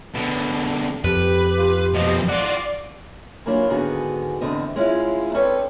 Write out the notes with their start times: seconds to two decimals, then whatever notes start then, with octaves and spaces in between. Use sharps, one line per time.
0.15 B2 D3
1.04 F2 G4 B4
1.58 F4
1.94 B2 F3 D#5
2.28 F4 F#4 D5
3.46 E3 F#3 A#3 C#4 D4 F4
3.70 G#2 D3 D#3 B3 F#4 G#4
4.41 E2 G#2 D3 C4 D#5
4.76 G#3 C#4 E4 F4
5.34 C4 C#4 A4 B4 C#5 D5